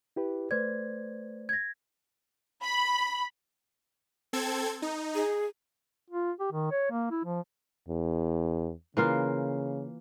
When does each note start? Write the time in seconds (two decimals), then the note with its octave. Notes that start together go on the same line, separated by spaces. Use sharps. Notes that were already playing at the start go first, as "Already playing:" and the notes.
0.16 E4 G4 B4
0.51 A3 B4 C5 D5 G#6
1.49 G#6 A#6
2.62 B5
4.33 C4 A4 G#6
4.82 D#4
5.15 G#4
6.10 F4
6.40 G4
6.52 D#3
6.71 C#5
6.91 A#3
7.11 E4
7.24 F3
7.88 E2
8.97 C#3 E3 A#3 F4